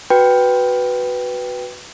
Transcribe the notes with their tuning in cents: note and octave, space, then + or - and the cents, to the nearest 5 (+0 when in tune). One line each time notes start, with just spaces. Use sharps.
F#4 +0 B4 +0 G5 +0